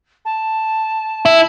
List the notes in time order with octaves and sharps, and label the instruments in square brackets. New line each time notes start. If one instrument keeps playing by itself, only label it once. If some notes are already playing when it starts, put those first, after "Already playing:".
[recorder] A5
[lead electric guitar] E4